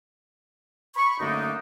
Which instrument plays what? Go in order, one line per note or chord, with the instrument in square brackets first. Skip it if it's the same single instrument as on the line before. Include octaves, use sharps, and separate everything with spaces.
[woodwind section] B5 C#6
F#2 D3 A3 A#3 D4 D#4